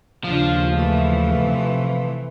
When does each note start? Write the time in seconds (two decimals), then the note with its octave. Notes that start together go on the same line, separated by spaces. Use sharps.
0.24 D#2 C#3 F3 D4 F4
0.74 E3 A3
1.38 C3 C4